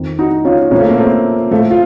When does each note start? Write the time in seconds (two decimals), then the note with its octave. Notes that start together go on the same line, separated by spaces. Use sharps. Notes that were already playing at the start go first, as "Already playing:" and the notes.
Already playing: F2 D#3
0.19 D#4 F#4
0.45 C#4 F4
0.71 A#2 A#3 C#4
0.75 F3
0.81 A3
0.90 A#3
0.98 A3 C4
1.51 A2 F3 A3
1.71 F4